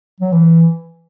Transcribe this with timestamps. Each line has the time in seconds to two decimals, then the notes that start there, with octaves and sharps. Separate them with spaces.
0.20 F#3
0.32 E3